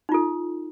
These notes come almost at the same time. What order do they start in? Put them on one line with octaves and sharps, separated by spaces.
D#4 F4 A4